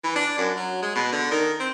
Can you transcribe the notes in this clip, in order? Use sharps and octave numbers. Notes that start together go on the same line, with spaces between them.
E3
D4
F#2
F#3
G#3
B2
D3
D#3
C4